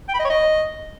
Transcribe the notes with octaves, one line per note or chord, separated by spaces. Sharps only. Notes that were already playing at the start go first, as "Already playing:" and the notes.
G5
B5
D#5
C#5
D#5